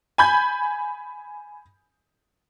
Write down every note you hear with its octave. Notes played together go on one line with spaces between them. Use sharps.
G#5 B5 G6 G#6